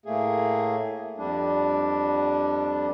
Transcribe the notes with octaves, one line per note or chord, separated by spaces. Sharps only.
A2 A3 A#3 G#4
F2 G3 D4